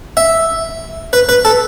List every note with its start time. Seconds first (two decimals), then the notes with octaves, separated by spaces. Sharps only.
0.17 E5
1.13 B4
1.29 B4
1.45 A4